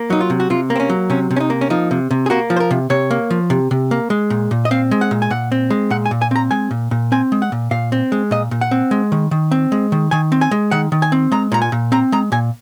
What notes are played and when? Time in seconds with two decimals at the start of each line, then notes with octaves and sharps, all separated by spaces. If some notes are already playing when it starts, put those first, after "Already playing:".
Already playing: A#3
0.10 F#3 D#4
0.21 F4
0.30 C3
0.40 F#4
0.50 C3 F4
0.70 A#3
0.76 C4
0.80 C#4
0.89 F#3
1.10 C3 C#4
1.31 C3
1.36 C#4
1.40 D#4
1.50 A#3
1.61 C#4
1.70 F3 D#4
1.91 C3
2.11 C3
2.26 G#4
2.30 A#3 F#4
2.50 F3
2.56 C5
2.60 A#4
2.71 C3
2.90 C3 C#5
3.11 A#3
3.30 F3
3.50 C3
3.71 C3
3.91 A#3
4.10 G#3
4.30 A#2
4.51 A#2
4.65 D#5
4.71 C4 F5
4.91 G#3
5.01 F#5
5.11 A#2
5.22 G#5
5.30 A#2 F#5
5.52 C4
5.70 G#3
5.90 A#2 F#5
6.06 G#5
6.11 A#2
6.22 G#5
6.31 C4 A#5
6.51 G#3 G#5
6.71 A#2
6.91 A#2
7.12 C4 G#5
7.32 G#3
7.42 F#5
7.52 A#2
7.71 A#2 F5
7.92 C4
8.12 G#3
8.31 A#2 D#5
8.51 A#2
8.61 F#5
8.71 C4
8.91 G#3
9.12 D#3
9.31 D#3
9.51 C4
9.72 G#3
9.92 D#3
10.11 D#3 G#5
10.32 C4
10.41 G#5
10.51 G#3
10.71 D#3 F#5
10.92 D#3
11.02 G#5
11.12 C4
11.32 G#3 A#5
11.52 A#2 A#5
11.62 G#5
11.72 A#2
11.92 C4 A#5
12.12 G#3 A#5
12.32 A#2 G#5